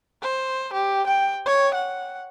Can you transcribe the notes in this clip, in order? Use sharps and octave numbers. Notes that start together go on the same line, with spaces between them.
C5
G4
G5
C#5
F#5